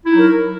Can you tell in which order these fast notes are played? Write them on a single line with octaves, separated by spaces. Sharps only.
E4 D#4 F#3 A#4